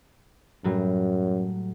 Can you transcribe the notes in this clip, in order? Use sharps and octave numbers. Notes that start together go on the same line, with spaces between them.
F#2 A2 F#3 G3